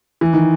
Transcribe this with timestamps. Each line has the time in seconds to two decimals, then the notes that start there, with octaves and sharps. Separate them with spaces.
0.21 E3
0.33 D#3